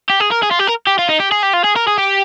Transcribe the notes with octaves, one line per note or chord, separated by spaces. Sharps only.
G4
G#4
A#4
G#4
F4
G4
A#4
G4
F4
D#4
G4
G#4
G4
F4
G#4
A#4
G#4
G4